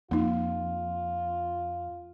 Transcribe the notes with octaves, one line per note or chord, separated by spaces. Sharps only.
F2 A#3 D#4 F4